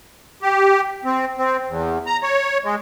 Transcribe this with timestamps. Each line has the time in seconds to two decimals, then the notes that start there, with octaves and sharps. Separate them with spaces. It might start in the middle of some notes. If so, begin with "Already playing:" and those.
0.42 G4
1.05 C4
1.38 C4
1.68 E2
2.06 A#5
2.23 C#5
2.64 G#3